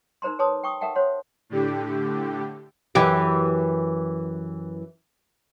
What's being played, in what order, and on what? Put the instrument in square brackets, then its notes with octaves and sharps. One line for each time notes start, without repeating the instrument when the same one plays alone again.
[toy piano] D#4 A#4 C5 A#5 C6
G#4 B4 C#5 A5 C6 D#6
G5 C#6 D#6
A4 A#4 E5 F#5 G5 A5
C5 C#5 F#5 C6
[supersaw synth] A2 D3 G4
[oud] F#2 E3 G4